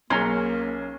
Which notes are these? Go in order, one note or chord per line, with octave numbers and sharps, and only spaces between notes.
B1 A#3 C#4 G#4 A#5 C6